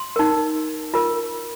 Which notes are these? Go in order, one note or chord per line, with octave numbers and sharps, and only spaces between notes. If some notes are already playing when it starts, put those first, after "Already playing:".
Already playing: C6
D#4 A#4
F4 A#4